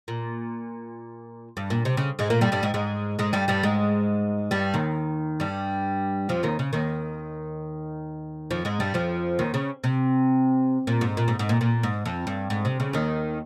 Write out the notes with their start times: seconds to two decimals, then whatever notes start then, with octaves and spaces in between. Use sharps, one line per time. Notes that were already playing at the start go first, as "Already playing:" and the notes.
0.08 A#2
1.57 G2
1.70 A#2
1.85 C3
1.97 C#3
2.19 G#2 G#3
2.30 A#2 A#3
2.41 G2 G3
2.52 G2 G3
2.63 G#2 G#3
2.74 G#2 G#3
3.19 G#2 G#3
3.33 G2 G3
3.48 G2 G3
3.63 G#2 G#3
4.51 G2 G3
4.74 D#2 D#3
5.40 G2 G3
6.29 F2 F3
6.43 D#2 D#3
6.59 C#3
6.73 D#2 D#3
8.51 F2 F3
8.65 G#2 G#3
8.80 G2 G3
8.94 F2 F3
9.39 D#2 D#3
9.54 C#3
9.84 C3
10.87 A#2
11.01 G#2
11.17 A#2
11.28 G#2
11.39 G#2
11.49 A#2
11.61 A#2
11.83 G#2
12.06 F2
12.27 G2
12.50 G#2
12.65 C3
12.80 C#3
12.93 D#2 D#3